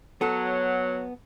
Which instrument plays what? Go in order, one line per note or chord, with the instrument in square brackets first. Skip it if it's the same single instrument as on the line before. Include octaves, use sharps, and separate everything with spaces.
[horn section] F#3 [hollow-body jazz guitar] B3 A4